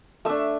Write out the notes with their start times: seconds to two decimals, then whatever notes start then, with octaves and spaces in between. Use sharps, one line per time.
0.25 A3 D4 E5